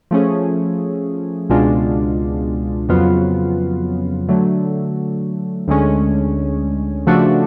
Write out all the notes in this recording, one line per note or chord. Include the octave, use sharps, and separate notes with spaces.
F3 A3 C#4 G#4
C#2 B2 G#3 D4 F4
F2 C#3 F#3 B3 F4
D3 F#3 A3
D2 D3 G#3 C#4
C#3 F3 A3 D4 F#4